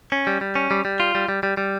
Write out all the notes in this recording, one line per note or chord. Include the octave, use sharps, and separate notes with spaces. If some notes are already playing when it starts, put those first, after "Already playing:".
C#4
G3
G3
C#4
G3
G3
F4
G3
G3
G3
G3